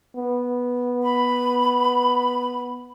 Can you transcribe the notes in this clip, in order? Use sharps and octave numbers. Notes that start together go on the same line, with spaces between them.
B3
B5